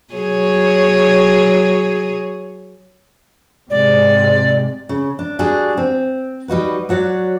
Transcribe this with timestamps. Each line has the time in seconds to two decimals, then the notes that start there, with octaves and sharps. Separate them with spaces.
0.14 F#3 G#4 C#5
3.70 G#2 C3 G#3 D5
4.89 C#3
5.19 D4
5.39 G3 D4 F#4 G#4
5.77 C4
6.48 G3 D#4 F#4 B4
6.89 F#3 F#4 C#5 D5